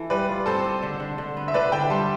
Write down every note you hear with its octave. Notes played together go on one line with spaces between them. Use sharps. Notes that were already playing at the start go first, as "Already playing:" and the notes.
Already playing: E3 A4
G3 B4 D5
F4
C4 A4 C5
C4
D3
D3
D3
B3
E5
D3 B4 D5
D3 G5 B5
G3 A5 C6